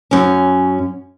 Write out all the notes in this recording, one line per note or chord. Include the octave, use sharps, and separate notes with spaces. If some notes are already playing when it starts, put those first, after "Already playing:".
F#2 C#4